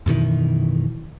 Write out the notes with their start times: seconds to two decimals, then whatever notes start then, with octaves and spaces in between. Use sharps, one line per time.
0.06 F#2 B2 D#3 E3